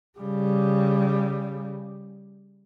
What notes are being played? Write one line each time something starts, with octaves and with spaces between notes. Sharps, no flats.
C#3 G3